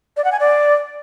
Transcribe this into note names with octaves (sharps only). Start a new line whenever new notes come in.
D5
F#5
G#5
D5